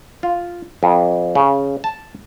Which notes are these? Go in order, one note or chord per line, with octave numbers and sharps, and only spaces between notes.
F4
F2
C#3
A5